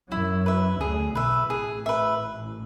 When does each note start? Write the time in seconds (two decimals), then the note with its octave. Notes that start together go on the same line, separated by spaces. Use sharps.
0.11 F#2 F#3 E4
0.46 B4 E5
0.81 D2 D3 G#4
1.15 B1 B2 B4 E5
1.50 A1 A2 G#4
1.86 B4 E5